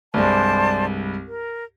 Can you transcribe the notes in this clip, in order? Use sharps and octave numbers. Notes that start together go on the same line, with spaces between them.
C2 G2 G#3 C5 D5 A5
A#4